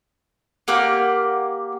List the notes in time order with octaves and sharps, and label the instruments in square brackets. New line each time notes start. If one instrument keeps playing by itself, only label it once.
[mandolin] A#3 G4 F#5 F6